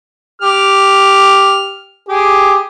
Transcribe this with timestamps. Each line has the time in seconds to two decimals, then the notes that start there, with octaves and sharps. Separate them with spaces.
0.42 G4 F6
2.09 G4 G#4